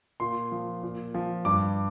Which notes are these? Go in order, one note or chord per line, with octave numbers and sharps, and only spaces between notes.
A#2 C6
F3
A#2
F3
G2 D6